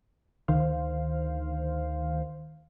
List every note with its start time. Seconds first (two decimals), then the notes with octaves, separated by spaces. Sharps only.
0.48 D2 D#3 C5 F5